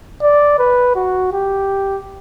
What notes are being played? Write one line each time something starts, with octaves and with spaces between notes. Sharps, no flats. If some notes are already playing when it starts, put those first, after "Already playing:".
D5
B4
F#4
G4